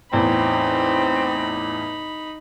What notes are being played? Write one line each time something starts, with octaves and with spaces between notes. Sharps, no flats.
E2 A2 C4 D#4 B5